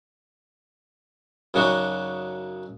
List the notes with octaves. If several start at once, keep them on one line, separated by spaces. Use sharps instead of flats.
F#2 C#3 D4 D#4 F#4